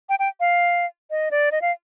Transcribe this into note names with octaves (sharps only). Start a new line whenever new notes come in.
G5
G5
F5
D#5
D5
D#5
F5